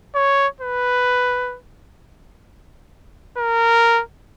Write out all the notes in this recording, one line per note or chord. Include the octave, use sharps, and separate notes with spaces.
C#5
B4
A#4